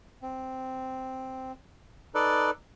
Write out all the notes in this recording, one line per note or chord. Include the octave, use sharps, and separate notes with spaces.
C4
D#4 A4 B4 D5